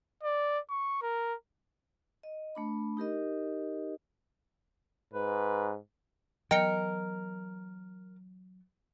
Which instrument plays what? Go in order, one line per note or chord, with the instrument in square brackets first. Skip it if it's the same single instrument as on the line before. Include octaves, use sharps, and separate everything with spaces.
[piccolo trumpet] D5
C#6
A#4
[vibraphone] D#5
A3 D4 B5
D#4 G4 A#4 D#5
[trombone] G#2 [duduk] B4
[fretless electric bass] E3 F#3 B3 [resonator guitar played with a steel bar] A#4 [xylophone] D#5 C#7 [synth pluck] G5